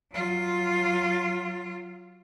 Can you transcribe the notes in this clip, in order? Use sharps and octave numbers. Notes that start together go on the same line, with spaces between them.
F#3 F4